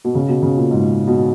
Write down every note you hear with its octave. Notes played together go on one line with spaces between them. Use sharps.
B2
C#3
B2
C#3
A#2
G#2
B2